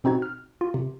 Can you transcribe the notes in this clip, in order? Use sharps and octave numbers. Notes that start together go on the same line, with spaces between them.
B2 C4 D#4 F#4 G#6
F6
F4
C3